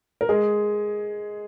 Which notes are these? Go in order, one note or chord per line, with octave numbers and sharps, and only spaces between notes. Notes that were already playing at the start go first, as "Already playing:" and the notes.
A#4
G#3 G#4